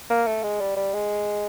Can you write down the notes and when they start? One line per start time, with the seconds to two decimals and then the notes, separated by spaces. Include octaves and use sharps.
0.10 A#3
0.27 A3
0.43 G#3
0.60 G3
0.77 G3
0.94 G#3